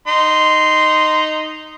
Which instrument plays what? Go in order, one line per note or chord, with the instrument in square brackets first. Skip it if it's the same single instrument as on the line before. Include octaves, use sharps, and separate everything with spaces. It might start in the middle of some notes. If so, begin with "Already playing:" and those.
[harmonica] D#4 C6